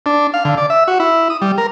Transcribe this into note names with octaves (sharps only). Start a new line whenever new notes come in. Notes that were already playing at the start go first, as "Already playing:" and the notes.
D4
F5
D3
D5
E5
F#4
E4
D#6
G3
A#4